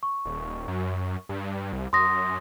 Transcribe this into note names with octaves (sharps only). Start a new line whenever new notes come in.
C#6
D#1
F#2
G2
C2
F#2 C6 D#6 A#6